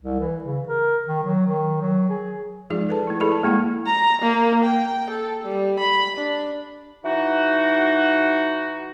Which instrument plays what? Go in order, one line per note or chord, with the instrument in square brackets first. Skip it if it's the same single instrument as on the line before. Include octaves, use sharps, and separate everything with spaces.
[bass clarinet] C2
E3
C#3
A#4
D#3
F#3
D#3
F#3
G#4
[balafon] F3 G#3 D#4 F4 G#4 D5
A4 B4 A5
A3 E4
E4 G#4 A4 D5 B5
A5
G#3 A#3 E4 F#5
[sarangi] A#5
A#3
G5
A4
G3
B5
D4
[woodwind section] E3 D#4 F#4